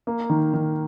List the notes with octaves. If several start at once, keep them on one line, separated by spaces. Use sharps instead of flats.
A#3
D#3
D#3